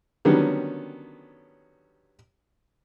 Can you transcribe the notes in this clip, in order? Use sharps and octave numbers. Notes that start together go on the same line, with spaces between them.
D3 D#3 F#3 G3 B3 C#4